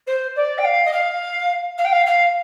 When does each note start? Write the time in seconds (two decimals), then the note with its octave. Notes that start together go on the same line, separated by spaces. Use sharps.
0.06 C5
0.35 D5
0.58 G5
0.64 F5
0.85 D#5
0.92 F5
1.77 F5
1.84 G5
1.92 F5
2.06 F5